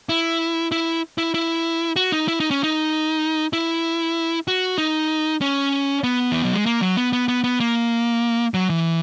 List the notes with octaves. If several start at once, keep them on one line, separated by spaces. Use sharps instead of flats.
E4
E4
E4
E4
F#4
D#4
E4
D#4
C#4
D#4
E4
F#4
D#4
C#4
B3
E3
F#3
G#3
A#3
F#3
B3
B3
B3
B3
A#3
F#3
E3